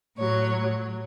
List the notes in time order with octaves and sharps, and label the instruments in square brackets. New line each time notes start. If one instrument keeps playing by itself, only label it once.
[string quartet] A2 F#3 C#5